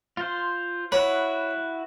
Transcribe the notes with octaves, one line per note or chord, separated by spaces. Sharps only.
F4 C5
E4 F#4 B4 C#5